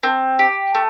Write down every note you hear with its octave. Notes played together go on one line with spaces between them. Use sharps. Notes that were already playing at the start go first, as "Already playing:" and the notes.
C4
G4
A3